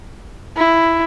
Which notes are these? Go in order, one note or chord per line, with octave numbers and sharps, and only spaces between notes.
E4